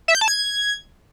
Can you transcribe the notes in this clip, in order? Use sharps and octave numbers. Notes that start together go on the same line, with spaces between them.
E5
G6
A5
G#6